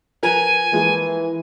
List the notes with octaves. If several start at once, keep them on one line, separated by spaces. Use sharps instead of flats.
F3 A#4 B4 G#5
E3 F3 G#3 A#3